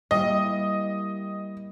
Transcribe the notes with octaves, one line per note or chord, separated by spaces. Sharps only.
G3 A#3 E4 D#5